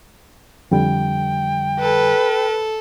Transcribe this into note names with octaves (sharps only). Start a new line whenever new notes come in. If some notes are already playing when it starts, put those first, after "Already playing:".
F2 D3 G3 G5
A4 B4